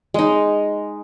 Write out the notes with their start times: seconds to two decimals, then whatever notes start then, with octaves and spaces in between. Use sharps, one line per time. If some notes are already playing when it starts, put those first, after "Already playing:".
0.14 G#3 D#4